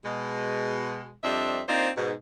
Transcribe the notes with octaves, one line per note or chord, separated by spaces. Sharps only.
B2 G#3
F2 G3 C4 D4 D#5 E5
A#3 C4 D4 D#4 F4 C5
G#2 B2